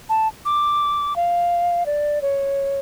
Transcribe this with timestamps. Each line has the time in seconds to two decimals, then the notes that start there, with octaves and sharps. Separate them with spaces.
0.09 A5
0.45 D6
1.16 F5
1.86 D5
2.22 C#5